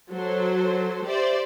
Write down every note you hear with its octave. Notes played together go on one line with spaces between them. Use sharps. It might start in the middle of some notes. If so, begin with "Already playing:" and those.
F#3 A4 C5
G4 C5 D5 E5